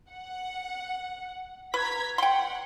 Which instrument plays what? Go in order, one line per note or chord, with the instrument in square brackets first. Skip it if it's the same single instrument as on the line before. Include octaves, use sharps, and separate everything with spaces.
[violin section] F#5
[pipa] B4 [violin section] A#5 G#6 B6
[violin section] F#5 [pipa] G5 C6